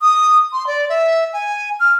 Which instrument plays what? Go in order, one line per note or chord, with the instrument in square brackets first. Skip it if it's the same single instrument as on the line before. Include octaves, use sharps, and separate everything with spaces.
[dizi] D#6
C6
D5
E5
G#5
F6